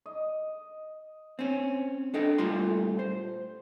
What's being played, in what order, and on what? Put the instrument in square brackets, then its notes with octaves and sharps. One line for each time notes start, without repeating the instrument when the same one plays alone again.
[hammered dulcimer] D#5
[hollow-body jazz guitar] C4 C#4
D4 A4 D#5 G5
A#2 G3 A3 F4 C6
C5